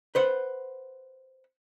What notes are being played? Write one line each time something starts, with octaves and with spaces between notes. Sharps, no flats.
B4 C5 F#5